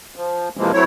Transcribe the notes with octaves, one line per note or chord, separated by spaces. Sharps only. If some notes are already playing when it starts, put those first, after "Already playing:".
F3
C3 E3 F3 G#3 A#3
F#3 A3 C4 E4 C#5